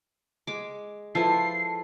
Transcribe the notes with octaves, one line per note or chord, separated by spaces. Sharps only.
G#3 D6
F3 E4 A4 B4 C7